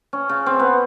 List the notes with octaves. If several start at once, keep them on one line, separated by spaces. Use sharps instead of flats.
C#4
C#3
C4
B3